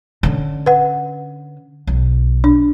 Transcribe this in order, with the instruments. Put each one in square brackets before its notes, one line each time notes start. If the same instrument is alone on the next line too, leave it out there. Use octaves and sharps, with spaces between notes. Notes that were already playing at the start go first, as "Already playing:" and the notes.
[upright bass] D3 C#4
[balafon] B4 F#5
[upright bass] B1
[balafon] D4